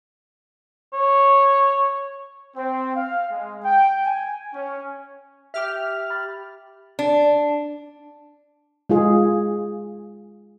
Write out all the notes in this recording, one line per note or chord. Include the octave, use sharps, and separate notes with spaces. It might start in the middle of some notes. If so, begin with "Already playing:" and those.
C#5
C4
F5
G#3
G5
G#5
C#4
G4 E5 D6 F6
B5 A6
D4
G#3 F4 G#4